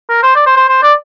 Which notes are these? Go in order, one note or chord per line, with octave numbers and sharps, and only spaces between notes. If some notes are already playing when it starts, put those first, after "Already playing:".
A#4
C5
D5
C5
C5
C5
D5